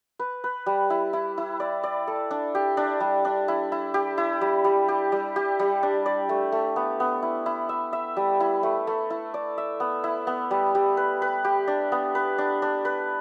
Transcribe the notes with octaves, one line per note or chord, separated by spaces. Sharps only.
B4
B4
G3
E4
E4
E4
D5
D5
A4
D4
G4
D4
G3
D4
E4
E4
G4
E4
G3
G3
G4
G3
G4
G3
D4
D5
A3
A3
B3
B3
E4
E4
E5
E5
G3
E4
A3
A3
E4
D5
E5
B3
E4
B3
G3
G3
B4
B4
G4
D4
B3
B4
D4
D4
B4